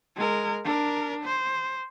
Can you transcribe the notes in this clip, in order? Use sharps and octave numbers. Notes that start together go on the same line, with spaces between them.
G#3 A#4
D4 A#4
C5